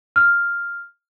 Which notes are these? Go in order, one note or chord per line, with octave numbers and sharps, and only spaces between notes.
F6